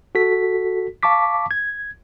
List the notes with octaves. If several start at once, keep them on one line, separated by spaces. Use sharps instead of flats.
F#4 A4 B6
F5 A5 C#6 D6 B6
G#6